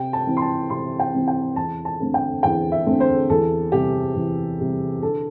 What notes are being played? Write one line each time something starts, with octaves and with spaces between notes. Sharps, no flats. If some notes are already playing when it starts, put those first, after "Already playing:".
Already playing: C3 G5
A5
E3 C4
C6
A5
C3 C6
G5
E3 C4
G5
E2 A5
A5
D3 A3 C4
G5
E2 G5
E5
D3 A3 C4
C5
E2 A4
C3 G3 G4
E2
C3 G3
D3 A4